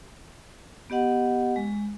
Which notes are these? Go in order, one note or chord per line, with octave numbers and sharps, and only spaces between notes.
B3 G4 D#5 F#5
G#3